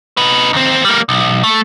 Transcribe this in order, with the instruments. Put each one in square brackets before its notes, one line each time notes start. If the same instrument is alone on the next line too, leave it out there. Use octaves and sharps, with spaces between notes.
[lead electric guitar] D#4 B4
D#2 C4
G3 A#3
B1
A3